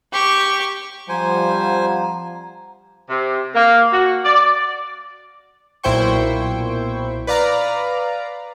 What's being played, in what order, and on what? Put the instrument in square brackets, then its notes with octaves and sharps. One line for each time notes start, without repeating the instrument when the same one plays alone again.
[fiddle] G4 C#6
[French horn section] F3 G3 [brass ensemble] C4 F5 F#5 [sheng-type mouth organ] C5 G#5 [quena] A#5
[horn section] C3
A#3
F#4
D5
[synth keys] B1 A#2 E4 C5 G5 C#6
B4 D5 F5 A#5